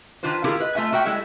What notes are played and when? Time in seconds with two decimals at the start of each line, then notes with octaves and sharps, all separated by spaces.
0.23 D#3 D4 F4 B4 C5
0.44 E4 F4 G4 G#4 A#4
0.60 B4 D#5
0.75 A3 F4 E5 G#5
0.92 A#3 F#4 E5 G5
1.05 G3 G#3 E4 A4 E5